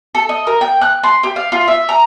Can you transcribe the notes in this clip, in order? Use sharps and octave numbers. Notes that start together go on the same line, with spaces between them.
A4
D#5
A#4
G5
F#6
C6
G4
F5
F4
E5
A#5